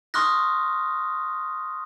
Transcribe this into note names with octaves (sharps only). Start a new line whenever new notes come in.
C6 C#6 D#6 F6 F#6 A#6